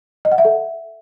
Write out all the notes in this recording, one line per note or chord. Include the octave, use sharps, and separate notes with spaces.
D#5
F#5
E5
A4